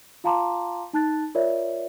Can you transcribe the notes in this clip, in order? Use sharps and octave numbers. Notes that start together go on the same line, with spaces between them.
F4 F5 A5 A#5 C6 D6
D#4 A5 F#6 A6
F4 A#4 C#5 D5 E5